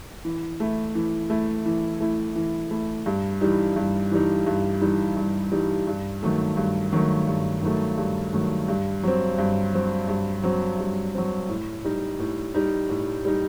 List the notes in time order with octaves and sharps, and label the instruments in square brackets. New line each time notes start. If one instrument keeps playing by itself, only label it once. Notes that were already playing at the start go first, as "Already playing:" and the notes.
[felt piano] E3
A3 E4
E3
A3 E4
E3
A3 E4
E3
A3 E4
G2
E3 G3 D#4
G2
E3 G3 D#4
G2
E3 G3 D#4
G2
E3 G3 D#4
G2
D#3 F#3 A3
G2
D#3 F#3 A3
G2
D#3 F#3 A3
G2
D#3 F#3 A3
G2
F#3 C4
G2
F#3 C4
G2
F#3 C4
G2
F#3 C4
A2
G3 D#4
A2
G3 D#4
A2
G3 D#4